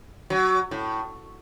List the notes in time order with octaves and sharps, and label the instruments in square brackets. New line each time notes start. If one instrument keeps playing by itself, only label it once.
[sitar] F#3
A2